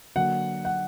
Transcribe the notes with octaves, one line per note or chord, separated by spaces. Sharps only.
D3 F#3 A#3 F#5
F#5